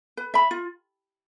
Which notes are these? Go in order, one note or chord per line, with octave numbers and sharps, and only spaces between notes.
B4
E5 B5
F4